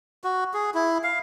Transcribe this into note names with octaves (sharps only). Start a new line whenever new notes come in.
F#4
G#4
E4
F5